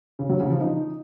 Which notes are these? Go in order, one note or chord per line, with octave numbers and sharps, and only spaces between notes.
C#3
F#3
C#3
F3
D#4